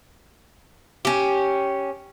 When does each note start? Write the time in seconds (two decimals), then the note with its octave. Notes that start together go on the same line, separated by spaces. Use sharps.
1.05 C#4 G4